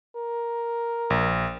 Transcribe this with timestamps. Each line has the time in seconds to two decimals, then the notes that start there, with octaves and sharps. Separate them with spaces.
0.15 A#4
1.10 A#1